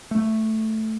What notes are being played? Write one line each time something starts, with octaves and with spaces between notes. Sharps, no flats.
A3